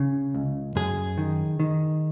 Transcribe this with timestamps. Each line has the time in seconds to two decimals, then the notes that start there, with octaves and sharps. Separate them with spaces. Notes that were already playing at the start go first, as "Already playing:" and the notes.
Already playing: C#3
0.34 C#2
0.76 F#2 G#4
1.18 D#3
1.60 D#3